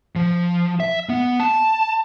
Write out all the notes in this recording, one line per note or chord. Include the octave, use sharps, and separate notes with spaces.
F3
E5
B3
A5